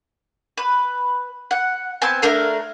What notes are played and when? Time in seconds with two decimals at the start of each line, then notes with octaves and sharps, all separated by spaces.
0.57 B4
1.51 F#5
2.02 B3 C4 G#5 A5
2.22 A3 D4 A#4 F5